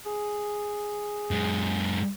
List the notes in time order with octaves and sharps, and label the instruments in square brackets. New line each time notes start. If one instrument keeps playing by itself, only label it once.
[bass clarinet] G#4
[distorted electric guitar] F#2 G#3